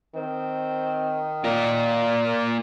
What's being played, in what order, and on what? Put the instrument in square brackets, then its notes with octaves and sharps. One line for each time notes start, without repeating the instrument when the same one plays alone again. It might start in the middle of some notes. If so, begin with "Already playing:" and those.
[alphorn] D#3 [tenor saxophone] C4
[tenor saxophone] A#2 [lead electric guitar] A#3 F4